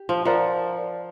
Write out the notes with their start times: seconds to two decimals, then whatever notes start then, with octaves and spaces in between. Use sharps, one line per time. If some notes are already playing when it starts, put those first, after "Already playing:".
Already playing: G4
0.09 F3
0.25 F3 A#4 D5 F#5 A#5